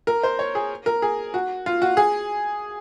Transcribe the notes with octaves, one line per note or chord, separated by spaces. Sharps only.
A#4
C5
C#5
G#4
A#4
G#4
F#4
F4
F#4
G#4